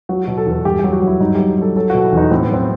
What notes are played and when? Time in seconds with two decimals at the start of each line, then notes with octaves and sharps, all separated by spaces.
0.09 F#3 F#4
0.24 B2 F#4
0.38 A4
0.47 E2
0.52 A4
0.65 G2 G4
0.79 G4
0.84 F#3
0.93 F#4
1.02 F#3
1.07 E4
1.20 G2 D#4
1.35 F#3 G4
1.58 F#3 A4
1.76 F#3 A4
1.90 F#4
1.95 B2
2.04 E4
2.12 E2 D#4
2.31 A2 C4
2.43 B3
2.50 F#3 C4